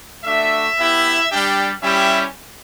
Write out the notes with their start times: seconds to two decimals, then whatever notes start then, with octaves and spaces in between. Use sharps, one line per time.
0.24 A3 D4 F#4 E5
0.77 B3 E4 G4
1.30 G3 D4 G4
1.82 G3 C#4 E4 G4 E5